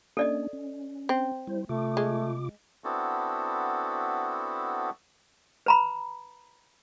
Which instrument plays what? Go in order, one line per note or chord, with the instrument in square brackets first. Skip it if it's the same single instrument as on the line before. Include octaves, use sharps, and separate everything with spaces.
[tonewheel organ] A#3 C#4 D4 [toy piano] A4 D5 D#5
[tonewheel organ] C#4
[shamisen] C4
[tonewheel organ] G3 E4 C5
[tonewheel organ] C3 F4 D6 [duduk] A3
[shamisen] G#3
[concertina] B3 C4 D4 E4 F#4 A4
[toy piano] B4 A#5 B5